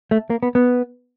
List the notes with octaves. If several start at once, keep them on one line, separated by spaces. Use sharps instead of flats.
A3
A#3
B3
B3